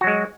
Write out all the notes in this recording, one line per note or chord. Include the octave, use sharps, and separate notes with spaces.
F#3 G#3 F#4